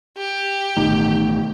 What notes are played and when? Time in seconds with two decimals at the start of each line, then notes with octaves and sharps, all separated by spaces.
0.17 G4
0.77 A1 B2 D#3 A3 D#4